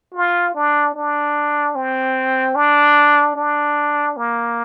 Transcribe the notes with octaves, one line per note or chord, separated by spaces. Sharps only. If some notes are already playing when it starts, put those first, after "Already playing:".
F4
D4
D4
C4
D4
D4
A#3